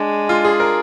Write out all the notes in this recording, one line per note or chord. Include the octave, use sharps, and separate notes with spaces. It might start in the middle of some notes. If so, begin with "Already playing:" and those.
Already playing: G#3 D4
F4
G#4
A#4